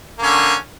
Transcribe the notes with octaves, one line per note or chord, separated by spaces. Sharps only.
D3 A#3 C#4